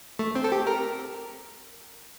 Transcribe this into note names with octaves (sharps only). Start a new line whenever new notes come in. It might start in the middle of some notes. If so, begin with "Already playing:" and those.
A3
C4
A4
G4
A#4